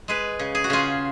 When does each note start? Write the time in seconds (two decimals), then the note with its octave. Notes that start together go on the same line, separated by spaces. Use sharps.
0.08 G#3 G#4 B4
0.39 C#3
0.55 G#4
0.64 F#4
0.70 C#3 F4 G#4